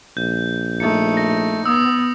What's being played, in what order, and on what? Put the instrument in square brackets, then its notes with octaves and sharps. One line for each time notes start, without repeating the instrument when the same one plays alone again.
[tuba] A#1 [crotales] G6
[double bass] A3 D#4 [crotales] C#7
[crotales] A#6
[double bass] B3 [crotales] D#6 E6